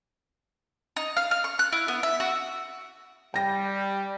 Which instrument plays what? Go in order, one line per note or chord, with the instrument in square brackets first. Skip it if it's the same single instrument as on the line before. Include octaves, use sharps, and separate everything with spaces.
[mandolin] D#4
F5
F6
C#6
F#6
E4
B3
E5
F#4
[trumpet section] G3 [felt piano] G5 A#6